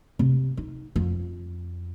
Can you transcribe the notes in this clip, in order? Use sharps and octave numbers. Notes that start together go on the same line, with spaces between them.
C3
D#4
F2